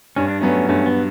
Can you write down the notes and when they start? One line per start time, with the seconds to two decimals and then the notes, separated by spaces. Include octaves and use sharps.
0.16 G2 C#4
0.28 D4
0.40 F#3 A3 B3 C#4
0.69 G2 A3 C#4
0.86 B3